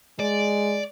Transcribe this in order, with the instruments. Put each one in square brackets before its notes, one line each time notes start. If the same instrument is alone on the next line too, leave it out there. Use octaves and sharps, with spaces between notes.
[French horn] G#3 [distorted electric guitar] D5